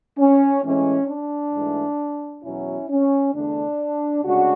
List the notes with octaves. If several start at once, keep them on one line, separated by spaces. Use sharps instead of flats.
C#4
A2 E3 G#3 C#4
D4
G#2 E3 A3
E2 B2 F#3 C#4 E4
C#4
E2 D3 A3 D4
D2 C#3 G#3 D4 F#4